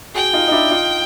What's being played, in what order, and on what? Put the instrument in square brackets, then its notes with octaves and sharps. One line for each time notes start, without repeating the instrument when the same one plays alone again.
[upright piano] F#4 G#4 [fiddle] G5
[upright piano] D#4 F4
D#4
D4 E4
D#4 F4